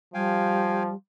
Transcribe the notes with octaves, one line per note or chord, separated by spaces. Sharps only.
F3 G3 F5 G5 G#5